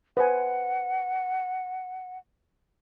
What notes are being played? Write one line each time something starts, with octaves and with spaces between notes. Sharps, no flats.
B4 C5 F#5 G#5